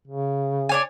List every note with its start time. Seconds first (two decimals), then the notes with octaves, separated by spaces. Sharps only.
0.08 C#3
0.69 D4 C#5 G#5